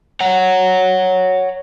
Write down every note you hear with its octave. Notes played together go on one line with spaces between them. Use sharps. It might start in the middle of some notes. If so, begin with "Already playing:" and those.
C#5 F#5